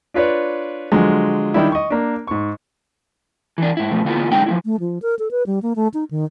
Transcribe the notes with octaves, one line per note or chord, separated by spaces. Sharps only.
D4 F4 B4 C#5 D5
D3 F3 F#3 G#3
D#3 G3 D4 E4
D#5 C#6
A#3 D4
G#2 C#6
E3 D4
G#2 E4
B2 F3 A3
D3 A#3 B3 E4 F4 A4
D3 F#3 G#3 D#4 G5
F3 G#3 E4
A3
F3
A#4
A4
B4
G3
A#3
A3
D#4
D#3